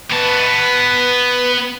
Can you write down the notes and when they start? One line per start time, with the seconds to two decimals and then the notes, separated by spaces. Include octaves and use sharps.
0.11 B3 B4 A5